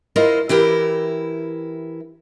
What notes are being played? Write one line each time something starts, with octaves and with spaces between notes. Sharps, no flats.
E4 F4 A#4 C5 D#5
E3 E4 G4 A#4